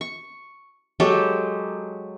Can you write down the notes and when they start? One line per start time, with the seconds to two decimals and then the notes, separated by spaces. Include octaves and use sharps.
0.01 C#6
1.00 F#3 G#3 G4 A4